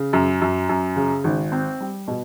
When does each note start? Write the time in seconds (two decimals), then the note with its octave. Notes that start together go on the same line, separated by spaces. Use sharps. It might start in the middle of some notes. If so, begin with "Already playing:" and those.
Already playing: C#3
0.13 F#2
0.42 F#2
0.69 F#2
0.96 C#3
1.24 G#1
1.52 C4
1.80 G3
2.08 B2